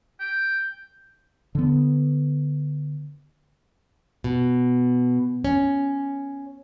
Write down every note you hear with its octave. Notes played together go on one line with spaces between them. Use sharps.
G5
D3 B3
B2
C#4